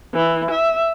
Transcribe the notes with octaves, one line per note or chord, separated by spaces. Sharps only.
E3
E5